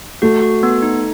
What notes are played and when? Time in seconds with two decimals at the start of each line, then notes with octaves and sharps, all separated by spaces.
0.22 A3 F#4
0.42 F#4
0.63 B3
0.82 D#4